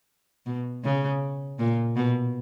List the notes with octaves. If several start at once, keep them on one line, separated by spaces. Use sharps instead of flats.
B2
C#3
A#2
B2